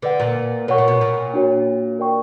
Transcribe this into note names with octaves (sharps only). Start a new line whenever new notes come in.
D3 B4 D5 F#5
A#2
B2 A#4 C#5 F#5 C#6
A#2
B2
A#2
D4 F#4 C#5
A#4 D5 G5 C#6